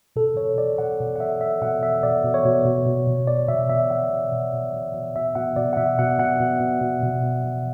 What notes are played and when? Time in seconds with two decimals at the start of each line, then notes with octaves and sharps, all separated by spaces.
0.16 B2 A4
0.36 B2 C#5
0.58 B2 D5
0.78 B2 F#5
1.00 B2
1.16 F#5
1.20 B2 E5
1.40 B2 E5
1.61 B2 F#5
1.82 B2 E5
2.03 B2 D5
2.24 B2
2.34 C#5
2.45 B2
2.65 B2
2.86 B2
3.07 B2
3.27 B2 D5
3.48 B2 E5
3.70 B2 E5
3.91 B2 F#5
4.11 B2
4.32 B2
4.53 B2
4.74 B2
4.94 B2
5.16 B2 E5
5.35 B2 F#5
5.56 B2 D5
5.73 F#5
5.77 B2 E5
5.99 B2 F#5
6.19 B2 F#5
6.40 B2
6.60 B2
6.81 B2
7.03 B2
7.23 B2
7.45 B2